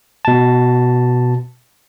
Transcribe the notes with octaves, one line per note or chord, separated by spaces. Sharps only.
B2 A5